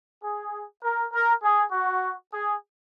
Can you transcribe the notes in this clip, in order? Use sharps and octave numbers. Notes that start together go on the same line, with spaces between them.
G#4
A#4
A#4
G#4
F#4
G#4